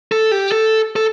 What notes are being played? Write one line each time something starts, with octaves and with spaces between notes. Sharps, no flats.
A4
G4
A4
A4